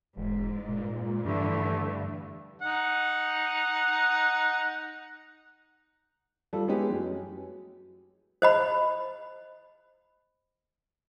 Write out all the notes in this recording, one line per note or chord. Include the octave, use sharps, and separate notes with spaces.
E1 G#2
A#2
G2 D3 E3 A3
D#4 F#5
G3 F4 A4
G#3 B3 C#4 E4 G4 G#4
F#2
C5 D#5 B5